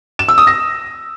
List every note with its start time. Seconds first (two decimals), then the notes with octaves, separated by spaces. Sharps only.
0.19 E7
0.28 E6
0.38 D#6
0.47 A#6